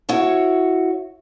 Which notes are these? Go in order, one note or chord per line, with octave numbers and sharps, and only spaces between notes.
E4 F#4 C#5